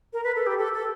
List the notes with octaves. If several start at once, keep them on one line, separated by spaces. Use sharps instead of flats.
A#4
B4
A4
G4
A4
A4